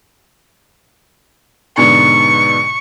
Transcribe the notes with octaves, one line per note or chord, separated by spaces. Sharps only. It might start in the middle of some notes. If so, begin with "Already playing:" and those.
G#2 B2 D3 C#6